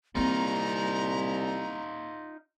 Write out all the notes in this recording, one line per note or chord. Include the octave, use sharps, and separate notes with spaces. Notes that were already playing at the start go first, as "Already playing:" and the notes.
C2 A#3 C4 D#4 F4 A#5